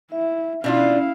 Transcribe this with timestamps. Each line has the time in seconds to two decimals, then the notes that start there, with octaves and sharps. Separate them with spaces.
0.12 E4 E5
0.64 B2 C#4 D4 E4 F4 F5